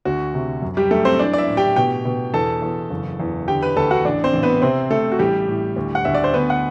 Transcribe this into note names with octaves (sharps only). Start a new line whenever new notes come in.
D2 F#4
C3
F#2
G3 G4
F#2 A3 A4
C4 C5
E3 D4 D5
D5
E4 E5
A2
G4 G5
B2 G4 G5
B2
E2 A4 A5
E2
F#1
E2
D3 G4 G5
B4 B5
D2 A4 A5
F#4 F#5
A1 D4 D5
C4 C5
A1
B3 B4
C3 C4 C5
C3 A3 A4
F#4
A1 G3 G4
A2
D2
F#5
D2 E5
D5
C5
D2 B3 B4
F#5